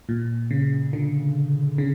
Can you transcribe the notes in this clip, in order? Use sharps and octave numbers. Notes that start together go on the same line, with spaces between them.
A#2
C#3
D3
C#3